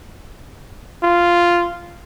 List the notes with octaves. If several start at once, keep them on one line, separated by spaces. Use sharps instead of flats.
F4